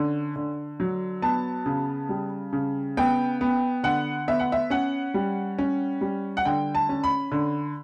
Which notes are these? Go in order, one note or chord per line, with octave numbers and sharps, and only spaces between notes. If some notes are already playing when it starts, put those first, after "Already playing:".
Already playing: D3 C#4
D3
F#3
B3 A5
C#3
G3
C#3
B3 G5
B3
D3 F#5
B3 E5
F#5
E5
C#4 F#5
G3
C#4
G3
F#5
D3 G5
A5
C#4
B5
D3